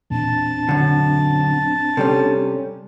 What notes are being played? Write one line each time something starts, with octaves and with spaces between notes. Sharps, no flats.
E2 A#2 C4 D4 A5
F#2 D3
C3 G3 C#4 A4